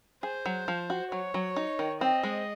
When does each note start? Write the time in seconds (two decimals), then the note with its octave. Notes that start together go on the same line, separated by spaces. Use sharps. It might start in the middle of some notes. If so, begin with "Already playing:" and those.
0.23 G#4 C5
0.46 F#3
0.68 F3
0.90 F#4
1.11 F#3 C#5
1.34 F#3
1.56 D#4
1.79 D#3
2.01 C4 D#5
2.23 G#3